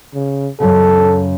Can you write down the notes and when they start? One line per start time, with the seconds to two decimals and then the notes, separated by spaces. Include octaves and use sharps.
0.14 C#3
0.60 F#2 A#2 C#3 A4